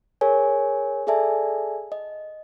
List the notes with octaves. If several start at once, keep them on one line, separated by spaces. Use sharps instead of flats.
G#4 A#4 C#5 G#5
G#4 A4 D5 E5 G#5 A5
D#5